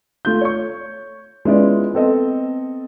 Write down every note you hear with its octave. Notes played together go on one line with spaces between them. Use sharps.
A3 F4 G6
C#5 C#6
G#3 B3 C#4 E4 F4 D5
B3 C4 A4 D#5